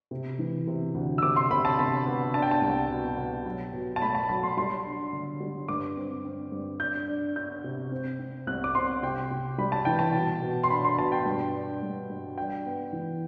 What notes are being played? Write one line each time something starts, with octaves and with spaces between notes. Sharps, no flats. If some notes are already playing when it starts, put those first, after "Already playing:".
C3
E3
C3
D2
E6
C3 D6
C6
C3 B5
A5
C3 B5
B3
D4 A5
G5
A5
C2
B2
B2
F#3
B2
A5
A3 B5
A5
F#3 B5
C6
G3 C6
D4
D3
G3
G2 D6
C4
C4
G2
D4 G6
D4
D4 G6
C3
C4
C4
C2 F#6
D6
C4 C6
C3 G5
C3
G3 B5
A5
E3 G5
A5
B2
B2
C6
D4 B5
C6
B2 A5
G5
G2
D4
G2
G2
D4 G5
B3
E3